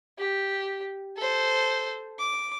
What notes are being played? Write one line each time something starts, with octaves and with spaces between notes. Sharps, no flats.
G4
A4 C5
D6